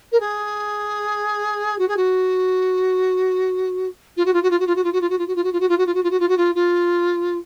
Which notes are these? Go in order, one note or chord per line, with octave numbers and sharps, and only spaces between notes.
A#4
G#4
F#4
G#4
F#4
F4
F#4
F4
F#4
F4
F#4
F4
F#4
F4
F#4
F4
F#4
F4
F#4
F4
F#4
F4
F#4
F4
F#4
F4
F#4
F4
F#4
F4
F#4
F4
F4